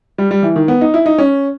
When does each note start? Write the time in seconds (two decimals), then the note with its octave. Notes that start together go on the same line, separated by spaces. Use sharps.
0.18 G3
0.31 G3
0.43 E3
0.56 D#3
0.68 B3
0.81 D#4
0.94 E4
1.06 D#4
1.18 C#4